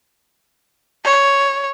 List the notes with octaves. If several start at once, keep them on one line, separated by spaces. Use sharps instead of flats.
C#5